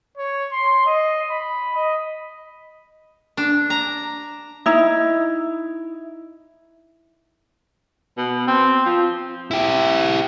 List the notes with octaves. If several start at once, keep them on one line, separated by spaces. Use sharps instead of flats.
C#5
C6
D#5
B5
D#5
D4
A#5
D#4 E4
B2
C4
F3
E4 G4